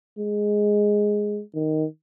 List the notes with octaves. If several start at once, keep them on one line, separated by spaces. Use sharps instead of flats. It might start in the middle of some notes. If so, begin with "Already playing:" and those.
G#3
D#3